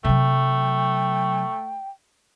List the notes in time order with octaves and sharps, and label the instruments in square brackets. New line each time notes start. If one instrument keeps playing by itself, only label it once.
[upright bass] C3 F#3 [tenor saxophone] A3 [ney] G5